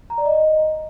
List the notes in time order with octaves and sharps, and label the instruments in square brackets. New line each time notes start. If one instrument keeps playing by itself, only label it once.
[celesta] A#5
D5
D#5